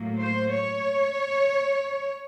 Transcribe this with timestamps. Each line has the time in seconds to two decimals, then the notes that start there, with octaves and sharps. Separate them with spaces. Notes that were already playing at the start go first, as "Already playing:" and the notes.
Already playing: A2 F#3 A#3
0.20 C5
0.52 C#5